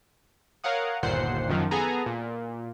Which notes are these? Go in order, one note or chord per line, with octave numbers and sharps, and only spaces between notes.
A#4 C#5 F5 F#5 D#6
G1 D#2 A#2 C5 F#5 C7
F#2 D#3 F3 F#3
B3 G#4 A4 G#5 A#5
A#2